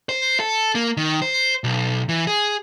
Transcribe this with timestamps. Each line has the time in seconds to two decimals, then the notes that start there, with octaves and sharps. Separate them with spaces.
0.09 C5
0.40 A4
0.75 A#3
0.97 D#3
1.22 C5
1.64 B1
2.09 E3
2.27 G#4